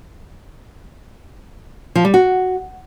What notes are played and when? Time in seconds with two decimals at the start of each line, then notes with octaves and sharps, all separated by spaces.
1.95 F3
2.05 G3
2.14 F#4